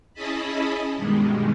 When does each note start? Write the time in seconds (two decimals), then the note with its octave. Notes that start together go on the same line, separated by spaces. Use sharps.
0.14 C#4 E4 G#4 D#5 A5 B5
0.95 G2 B2 D#3 G3 G#3